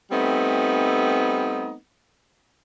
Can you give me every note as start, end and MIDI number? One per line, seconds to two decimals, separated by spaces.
0.11 1.74 55
0.11 1.74 57
0.11 1.74 59
0.11 1.74 60
0.11 1.74 63